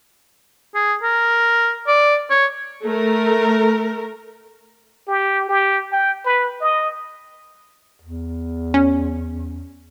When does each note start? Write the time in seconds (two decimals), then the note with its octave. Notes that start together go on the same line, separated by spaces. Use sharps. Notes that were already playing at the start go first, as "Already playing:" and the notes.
0.75 G#4
1.03 A#4
1.88 D5
2.31 C#5
2.84 A3 A#4
5.08 G4
5.49 G4
5.92 G5
6.25 B4
6.61 D#5
8.02 E2
8.74 C#4